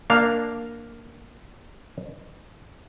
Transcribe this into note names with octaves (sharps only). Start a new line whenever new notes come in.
A#3 D4 F5